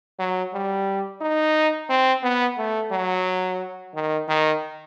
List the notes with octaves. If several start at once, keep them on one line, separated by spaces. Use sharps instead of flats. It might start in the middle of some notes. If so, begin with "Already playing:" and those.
F#3
G3
D#4
C4
B3
A3
F#3
D#3
D#3